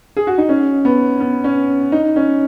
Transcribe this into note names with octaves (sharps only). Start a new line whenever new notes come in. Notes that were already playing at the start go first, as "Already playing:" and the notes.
G#4
F#4
D#4
C#4
B3
B3
C#4
D#4
C#4